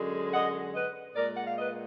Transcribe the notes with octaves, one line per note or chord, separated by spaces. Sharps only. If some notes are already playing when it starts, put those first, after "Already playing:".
Already playing: F#2 D3 G#3
D#5 F#5
B4 D#5
A#2 G#3 A#4 D5
F#5
F5
B4 D#5